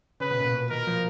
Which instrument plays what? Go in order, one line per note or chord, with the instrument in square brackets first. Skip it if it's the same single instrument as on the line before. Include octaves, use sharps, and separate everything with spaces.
[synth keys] C#3 [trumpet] B4
[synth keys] B2
A#2
B2
[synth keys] D#3 [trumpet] A#4
[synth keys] F3